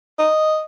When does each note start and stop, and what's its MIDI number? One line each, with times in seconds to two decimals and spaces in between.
0.19 0.64 75